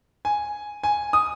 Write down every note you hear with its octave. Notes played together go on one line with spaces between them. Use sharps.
G#5
G#5
D#6